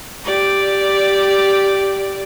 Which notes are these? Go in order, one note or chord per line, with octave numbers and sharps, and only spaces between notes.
G4 D5